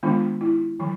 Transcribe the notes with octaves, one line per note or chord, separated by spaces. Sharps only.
D#3 G#3 B3 D4 F4
E4
D#3 F#3